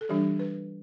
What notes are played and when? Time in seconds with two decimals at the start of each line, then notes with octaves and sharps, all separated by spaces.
0.01 A4
0.09 E3 G3 D4 G4
0.39 B4